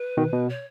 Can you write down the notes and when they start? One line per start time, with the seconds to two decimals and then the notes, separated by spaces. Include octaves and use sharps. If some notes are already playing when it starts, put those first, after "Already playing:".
Already playing: B4
0.17 B2 D#3
0.32 B2
0.48 C#5